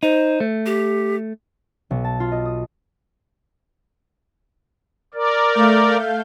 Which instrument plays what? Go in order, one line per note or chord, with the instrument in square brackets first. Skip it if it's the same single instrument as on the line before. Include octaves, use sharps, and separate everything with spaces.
[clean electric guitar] D#4 [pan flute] C5
[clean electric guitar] A3
[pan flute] G4
[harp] B1
A5
F4
D#5
D#6
[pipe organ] A#4 D5
[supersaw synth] A3 F5 G6